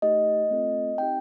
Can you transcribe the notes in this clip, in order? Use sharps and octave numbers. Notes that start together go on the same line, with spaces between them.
A3 D#4 G4 D#5
A3 C4 F4 A4
C4 D#4 G4 G5